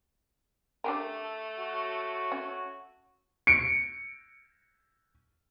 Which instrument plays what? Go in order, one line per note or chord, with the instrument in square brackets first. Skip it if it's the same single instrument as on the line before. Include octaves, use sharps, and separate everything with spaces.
[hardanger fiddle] A3 [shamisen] D4 G4 A#4
[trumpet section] F#4 [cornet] C#5
[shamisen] C#4
[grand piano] C#7 D7